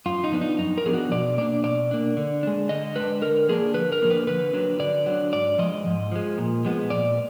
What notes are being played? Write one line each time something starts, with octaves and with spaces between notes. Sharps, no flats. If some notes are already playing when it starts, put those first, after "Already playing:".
F#2 F4
D#4
F3 B3 D4
D#4
F#2 D#4
A#4
F3 B3 D4 G#4
F#4
B2 D5
A#3 D4 D5
B2 D5
A#3 D4
D3
G#3 D4
D3 D#5
G#3 D4 B4
D3 A#4
F3 A#3 D4 G#4
D3 B4
A#4
F3 A#3 D4
B4
D3 B4
F#3 D4
D3 D5
F#3 D4
G#2 D5
F3 G#3 D#5
G#2
F3 G#3
A#2
F3 G#3 B3
A#2 D5